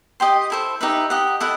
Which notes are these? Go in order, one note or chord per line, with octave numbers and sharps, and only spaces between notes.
G4 D#5 G5 C6
E4 A4 C5
D#4 G4 B4 E5
G4 D#5 F#5
E4 A4 D#5 F#5